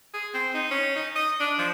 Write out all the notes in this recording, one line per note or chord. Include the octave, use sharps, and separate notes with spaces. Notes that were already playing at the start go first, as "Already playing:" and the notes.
G#4
C4
D#4
C#4
D#4
D#5
D4
F3